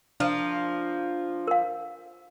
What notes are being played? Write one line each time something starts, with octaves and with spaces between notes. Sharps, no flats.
F3 A#3 D4 F4
A#4 F5